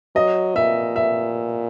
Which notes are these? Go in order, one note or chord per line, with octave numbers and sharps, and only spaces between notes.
F#3 D#5
A#2 E5
E5